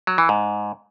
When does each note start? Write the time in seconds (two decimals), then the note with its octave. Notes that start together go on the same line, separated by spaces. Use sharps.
0.07 F#3
0.18 E3
0.29 G#2